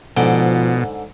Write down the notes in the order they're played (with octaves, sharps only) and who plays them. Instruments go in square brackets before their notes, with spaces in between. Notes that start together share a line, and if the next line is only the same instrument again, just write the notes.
[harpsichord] G#2 D3 G5 [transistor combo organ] B2 [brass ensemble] F3